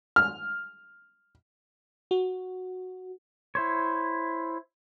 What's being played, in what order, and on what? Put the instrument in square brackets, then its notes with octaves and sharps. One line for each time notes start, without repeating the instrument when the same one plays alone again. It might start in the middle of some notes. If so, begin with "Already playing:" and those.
[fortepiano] F6
[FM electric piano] F#4
[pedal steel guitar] E4 C5 C#5